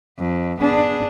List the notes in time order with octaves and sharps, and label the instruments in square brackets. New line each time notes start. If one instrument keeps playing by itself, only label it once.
[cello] F2
[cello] B3 G#4 [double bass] D4